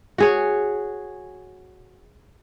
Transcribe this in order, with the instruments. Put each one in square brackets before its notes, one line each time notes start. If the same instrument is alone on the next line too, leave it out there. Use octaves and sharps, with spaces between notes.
[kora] F#4 G#4 C#5